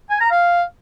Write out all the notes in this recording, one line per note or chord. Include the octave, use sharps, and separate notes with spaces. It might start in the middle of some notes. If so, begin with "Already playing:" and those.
G#5
A#5
F5